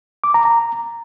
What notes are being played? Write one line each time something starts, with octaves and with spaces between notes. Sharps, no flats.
D6
A#5
A#5